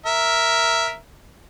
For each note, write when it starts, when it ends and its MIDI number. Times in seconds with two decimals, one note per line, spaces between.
0.06 0.96 70
0.06 0.96 76